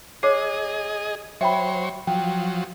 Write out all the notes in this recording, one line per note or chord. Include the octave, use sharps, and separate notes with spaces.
G#4 C#5 D#5 D6 C7
F#3 C5 C#5 E5 G5 B5
F3 F#3 G5